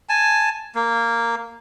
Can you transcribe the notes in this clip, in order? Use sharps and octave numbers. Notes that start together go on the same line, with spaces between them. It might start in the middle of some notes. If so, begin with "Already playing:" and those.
G#5 A5
A#3